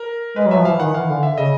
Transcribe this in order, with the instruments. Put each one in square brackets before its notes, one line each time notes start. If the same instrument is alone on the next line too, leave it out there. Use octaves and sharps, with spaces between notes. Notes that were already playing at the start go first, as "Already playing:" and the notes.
Already playing: [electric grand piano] A#4
[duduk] G#3 [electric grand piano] B4
[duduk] F#3
[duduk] F3 [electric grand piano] E5
[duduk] E3 [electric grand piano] F5
[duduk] D#3 [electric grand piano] F#5
[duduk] E3 [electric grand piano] F5
[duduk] D3
[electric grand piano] E5
[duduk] C#3 [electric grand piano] D#5